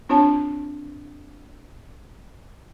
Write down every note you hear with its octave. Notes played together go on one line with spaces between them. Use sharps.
C4 D4 F4 C#5 A5